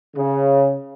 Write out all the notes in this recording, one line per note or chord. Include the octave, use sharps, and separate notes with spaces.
C#3